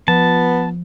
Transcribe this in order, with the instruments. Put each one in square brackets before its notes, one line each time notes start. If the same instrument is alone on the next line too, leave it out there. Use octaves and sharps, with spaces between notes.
[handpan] F3 [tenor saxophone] B3 [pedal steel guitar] A5